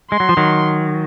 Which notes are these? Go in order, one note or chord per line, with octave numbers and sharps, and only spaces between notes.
G#3 C6
F#3
F3
D#3 F#3